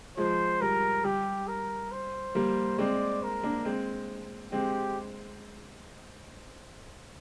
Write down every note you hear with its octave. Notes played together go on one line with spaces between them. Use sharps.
F3 G#3 C5
G3 A#4
G3 G4
A#4
C5
G3 A#3
G#3 C4 D5
A#4
A#3 D4
G#3 C4
G#3 C4 G4